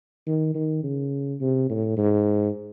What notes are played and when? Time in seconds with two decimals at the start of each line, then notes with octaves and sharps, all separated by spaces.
0.27 D#3
0.55 D#3
0.83 C#3
1.41 C3
1.70 A2
1.97 G#2